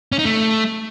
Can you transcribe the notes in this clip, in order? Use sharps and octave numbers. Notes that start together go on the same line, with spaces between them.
C#4
D#4
A3